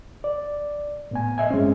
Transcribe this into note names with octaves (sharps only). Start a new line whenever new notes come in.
D5
A2 B3 G#5
D#5 E5 G#5
G2 G#3 C4 C#4